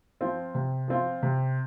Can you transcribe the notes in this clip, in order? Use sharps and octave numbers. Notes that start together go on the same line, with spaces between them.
F3 C4 F4
C3
F3 C4 F4
C3